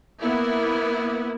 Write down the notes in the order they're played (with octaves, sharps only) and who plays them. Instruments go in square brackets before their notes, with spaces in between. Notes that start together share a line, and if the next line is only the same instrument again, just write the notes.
[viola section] A#3 B3 E4